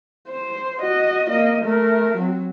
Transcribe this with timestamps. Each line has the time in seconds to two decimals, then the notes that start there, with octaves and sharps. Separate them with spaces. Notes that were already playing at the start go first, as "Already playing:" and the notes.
0.29 C5
0.81 F#4 D#5
1.29 A#3 D#5
1.64 A3 A#4
2.17 F#3 C4